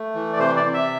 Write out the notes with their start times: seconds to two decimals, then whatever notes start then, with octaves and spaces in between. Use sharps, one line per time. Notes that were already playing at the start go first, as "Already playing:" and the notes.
Already playing: A3
0.15 E3
0.33 D5
0.39 C3 C5
0.57 D5
0.65 C3
0.73 E5